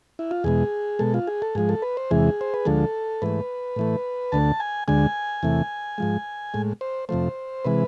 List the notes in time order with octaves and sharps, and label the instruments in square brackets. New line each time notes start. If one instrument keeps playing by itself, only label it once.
[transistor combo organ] E4
F4
E2 B2 G#3 G#4
B2 G#3 A4
F4
G#4
A4
G#2 F3 G#3 G#4
A4
B4
C5
E2 C3 E3 G#3 G#4
C5
B4
D2 D3 F3 G#3 A4
G#2 E3 A3 B4
A2 E3 A3
D2 D3 A3 A5
G#5
D2 D3 G#3 G#5
E2 C3 E3 A3
G#2 F3 G#3
A2 G#3
C5
F2 C3 F3 A3 C5
C3 E3 G#3 B4